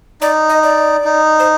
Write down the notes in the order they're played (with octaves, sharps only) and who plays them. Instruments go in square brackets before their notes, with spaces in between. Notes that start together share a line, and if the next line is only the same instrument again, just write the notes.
[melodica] D#4 [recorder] D5
[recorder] D#5
D5
[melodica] D#4
[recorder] C5